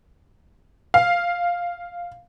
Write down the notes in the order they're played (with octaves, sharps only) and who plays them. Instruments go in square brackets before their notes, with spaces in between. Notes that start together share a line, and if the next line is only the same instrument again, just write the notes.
[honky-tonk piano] F5